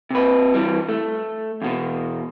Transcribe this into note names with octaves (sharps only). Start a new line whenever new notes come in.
C3 B4
E3 G3
A3
E2 B2